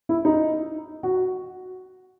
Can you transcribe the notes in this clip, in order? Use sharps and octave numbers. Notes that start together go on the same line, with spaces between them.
E4
D#4
F#4